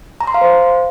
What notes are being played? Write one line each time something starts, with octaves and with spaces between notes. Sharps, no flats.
A#5
C6
F5
C5